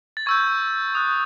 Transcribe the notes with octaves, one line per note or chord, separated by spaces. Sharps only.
A6
C#6 E6 G6 G#6
D#6 F#6